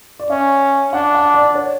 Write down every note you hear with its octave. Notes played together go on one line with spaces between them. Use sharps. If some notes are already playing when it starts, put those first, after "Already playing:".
D5
C#4 E5
D4 F#5
F#5
D5
C#5